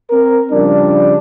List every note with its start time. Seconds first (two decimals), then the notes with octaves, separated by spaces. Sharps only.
0.10 C4 A#4
0.51 C#3 F3 G3 D4